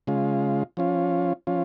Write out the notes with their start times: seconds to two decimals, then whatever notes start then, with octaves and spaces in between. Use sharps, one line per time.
0.07 C#3 G#3 F4
0.77 F3 C#4 F4
1.47 F3 C#4 F4